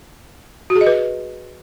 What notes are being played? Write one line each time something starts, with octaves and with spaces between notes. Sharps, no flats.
F#4
G#4
D#5
B4